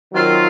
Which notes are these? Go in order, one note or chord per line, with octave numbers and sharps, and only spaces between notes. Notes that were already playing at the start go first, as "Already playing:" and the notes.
D#3 F#3 C4 F4 A#4